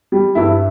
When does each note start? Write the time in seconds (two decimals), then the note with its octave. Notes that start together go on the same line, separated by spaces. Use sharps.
0.12 G3
0.35 G2 E4